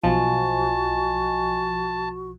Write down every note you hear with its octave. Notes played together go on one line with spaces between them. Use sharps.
B1 F3 F#4 D#5 G#5 A5